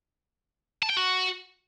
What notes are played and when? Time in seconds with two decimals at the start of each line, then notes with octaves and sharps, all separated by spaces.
0.83 A5
0.90 G5
0.97 F#4